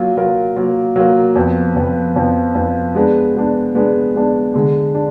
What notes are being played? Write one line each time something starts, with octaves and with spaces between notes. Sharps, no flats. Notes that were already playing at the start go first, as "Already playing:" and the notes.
Already playing: F#3 A#3 F4 A#4
F#3 A#3 F4 A#4
F#3 A#3 F4 A#4
F#3 A#3 F4 A#4
F2 F3 B3
F2 F3 B3
F2 F3 B3
F2 F3 B3
G#3 B3 D4
G#3 B3 D4
G#3 B3 D4
G#3 B3 D4
D3 G#3 D4
D4